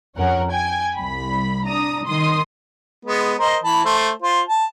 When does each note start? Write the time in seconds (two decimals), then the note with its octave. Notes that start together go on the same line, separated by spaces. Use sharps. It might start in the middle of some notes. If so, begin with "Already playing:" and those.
0.17 F2 C#4 A#4 F#5
0.51 G5 G#5 G#6
0.96 C2 B5
1.65 D4 A#5 D#6
2.06 D#3 C6 D#6
3.05 G#3 B3
3.39 A#4 C5 D#5
3.64 E3 A5 B5
3.85 A3 C5
4.22 F4 C5
4.48 A5